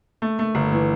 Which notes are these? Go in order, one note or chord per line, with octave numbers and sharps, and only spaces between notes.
A3
A3
G1
E3